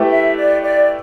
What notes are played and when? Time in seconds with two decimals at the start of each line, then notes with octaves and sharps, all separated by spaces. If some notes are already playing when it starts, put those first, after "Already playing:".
Already playing: A3 E4 G4 B4
0.08 E5
0.35 D5
0.62 D5